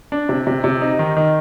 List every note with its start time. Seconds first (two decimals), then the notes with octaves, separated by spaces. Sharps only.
0.12 D4
0.29 C3
0.47 C3
0.64 C3
0.81 D#4
0.99 D#3
1.16 D#3